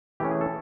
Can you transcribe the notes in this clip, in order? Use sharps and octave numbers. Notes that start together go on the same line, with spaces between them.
E3 A3 C#4 G4
G#4
A4